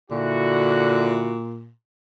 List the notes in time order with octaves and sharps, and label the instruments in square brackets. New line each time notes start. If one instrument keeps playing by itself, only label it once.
[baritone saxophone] A#2 [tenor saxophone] D3 [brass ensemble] E4 F#4